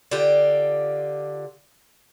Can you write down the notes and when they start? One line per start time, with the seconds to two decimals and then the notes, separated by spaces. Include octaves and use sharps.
0.11 D3 F4 G4